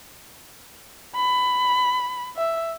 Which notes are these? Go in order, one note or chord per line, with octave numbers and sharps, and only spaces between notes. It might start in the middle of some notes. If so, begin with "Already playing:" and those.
B5
E5